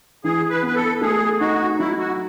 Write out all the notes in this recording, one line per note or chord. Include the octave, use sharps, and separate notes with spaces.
E3 G#4
B4
B3 B4
A4
A3 G#4
D#4 F#4
F#3 E4
F#4